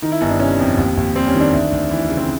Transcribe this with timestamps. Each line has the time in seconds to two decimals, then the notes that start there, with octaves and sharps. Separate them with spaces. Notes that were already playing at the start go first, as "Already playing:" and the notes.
0.02 D#3 D#4
0.12 E4
0.21 G1 D#4
0.30 D4
0.40 C3 C#4
0.60 F2
0.77 D#2
0.97 D#2
1.15 G3 C4
1.28 C#4
1.35 D#3
1.41 D4
1.53 D2
1.72 D2
1.91 E3
2.10 C#3
2.17 C4